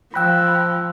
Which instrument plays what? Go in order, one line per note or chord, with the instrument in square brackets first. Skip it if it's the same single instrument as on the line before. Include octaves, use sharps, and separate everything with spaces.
[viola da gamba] F3 [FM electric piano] G5 B5 [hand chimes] E6 F#6 A#6